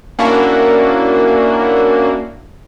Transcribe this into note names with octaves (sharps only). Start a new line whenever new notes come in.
A#3 C#4 D4 E4 F#4